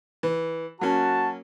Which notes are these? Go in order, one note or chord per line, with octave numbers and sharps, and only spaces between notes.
E3
F#3 A#3 C#4 F#4 A5